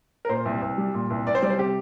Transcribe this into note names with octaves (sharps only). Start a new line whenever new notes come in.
A#4
A#2 C5
C2
C2
G3
A#2
C2
C2 D5
C5
G3 D5
C5
C3 G4